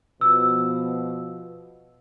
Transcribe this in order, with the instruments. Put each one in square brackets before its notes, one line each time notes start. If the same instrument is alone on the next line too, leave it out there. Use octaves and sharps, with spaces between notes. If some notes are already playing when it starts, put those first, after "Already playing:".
[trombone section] B2 F3 [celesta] E6